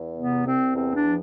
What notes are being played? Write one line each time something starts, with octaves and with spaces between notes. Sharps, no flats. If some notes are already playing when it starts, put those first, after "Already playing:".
Already playing: E2
C3 B3
C2 C4
E2 C4
D4
F3